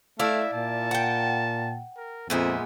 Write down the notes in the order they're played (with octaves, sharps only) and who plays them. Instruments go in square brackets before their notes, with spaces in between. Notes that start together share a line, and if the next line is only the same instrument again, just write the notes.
[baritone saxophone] A3 [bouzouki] E4 D5 F5 [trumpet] E5
[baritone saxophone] A#2 [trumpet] A5
[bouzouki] F#5 G5
[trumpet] A#4
[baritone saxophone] F2 [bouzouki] A#2 G#3 B3 [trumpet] E5